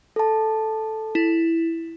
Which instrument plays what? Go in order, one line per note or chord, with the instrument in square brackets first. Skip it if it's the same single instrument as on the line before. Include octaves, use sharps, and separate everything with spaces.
[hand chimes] A4 A5
[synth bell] E4